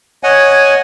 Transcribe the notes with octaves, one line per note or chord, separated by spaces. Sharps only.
C#5 D#5 F#5 G#5